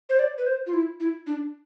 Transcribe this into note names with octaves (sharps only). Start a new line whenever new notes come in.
C5
D5
B4
C5
F4
E4
E4
D4